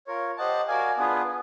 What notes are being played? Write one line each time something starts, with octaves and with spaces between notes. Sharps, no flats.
F4 A#4 C#5
G4 C5 D#5 F#5 A5
F#4 A#4 D5 F5 G#5
B3 D4 F4 G#4 B4